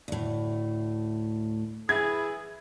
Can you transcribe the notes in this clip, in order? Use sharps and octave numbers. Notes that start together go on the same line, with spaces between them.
D2 A2
E3 E4 G#4 G#6